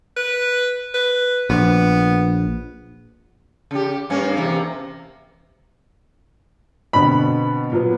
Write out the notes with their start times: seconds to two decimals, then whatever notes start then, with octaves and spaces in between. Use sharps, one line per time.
0.17 B4
0.94 B4
1.50 A#1 B3
3.71 C#3 G4
4.10 G2 A#3 C#4
4.36 E2 C3 A#3
6.93 B2 D3 C4 B5
7.72 A#2 F#3 B3